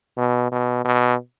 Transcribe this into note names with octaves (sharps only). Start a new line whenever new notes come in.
B2
B2
B2